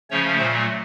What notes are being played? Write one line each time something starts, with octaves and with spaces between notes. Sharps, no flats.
C#3 F3 A3 C#4 C#5
A#2 F#3 A3 C5